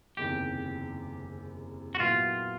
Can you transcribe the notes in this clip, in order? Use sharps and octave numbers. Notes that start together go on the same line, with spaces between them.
F#1 E2 C3 D#3 G4
F#4
A#2 F#3 B3 E4 F4